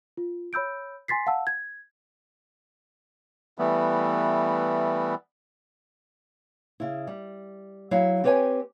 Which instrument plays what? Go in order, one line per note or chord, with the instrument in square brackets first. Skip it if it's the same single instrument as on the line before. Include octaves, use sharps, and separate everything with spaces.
[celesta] F4
C#5 B5 E6 G6 D7
G#5 C6 A6 B6 C7
F5 F#5 A5 E6
G#6
[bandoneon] E3 G3 A3 B3
[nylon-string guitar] C#3 E4
G3
F#3 E4 F5
C4 G4 B4 C#5 F#5 G#5